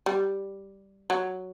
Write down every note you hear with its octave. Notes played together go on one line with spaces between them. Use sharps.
G3
F#3